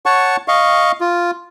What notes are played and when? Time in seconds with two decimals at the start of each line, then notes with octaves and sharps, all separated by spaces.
0.06 C#5 F#5 A5 C#6
0.48 D#5 F5 C#6
1.01 F4